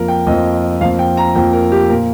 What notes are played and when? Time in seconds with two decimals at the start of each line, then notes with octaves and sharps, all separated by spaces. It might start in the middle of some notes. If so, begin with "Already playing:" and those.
Already playing: F2 F3 A#3 A#4
0.08 G5
0.27 F2 F3 A#3 D#5
0.81 F2 F3 A#3 F5
0.99 G5
1.17 A#5
1.35 F2 F3 A#3 G5
1.53 A#4
1.72 G4
1.89 A#2 A#3 A#4